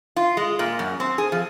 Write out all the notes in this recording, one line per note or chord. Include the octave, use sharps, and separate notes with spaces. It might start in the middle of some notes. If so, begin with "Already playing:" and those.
F4
G#3
A#2
F#2
C4
G#4
F3